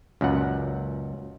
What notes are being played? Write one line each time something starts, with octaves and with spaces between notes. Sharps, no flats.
C#2 F#2 A#2 F#5